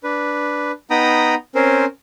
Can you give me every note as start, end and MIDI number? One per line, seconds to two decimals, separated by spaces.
0.03 0.71 62
0.03 0.71 71
0.90 1.35 59
0.90 1.35 63
0.90 1.35 79
0.90 1.35 82
0.90 1.35 83
0.90 1.35 87
1.55 1.85 60
1.55 1.85 61
1.55 1.85 70
1.55 1.85 72